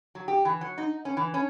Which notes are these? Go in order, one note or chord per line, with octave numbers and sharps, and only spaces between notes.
F#3
G4
E3
F#3
D#4
C#4
E3
C#4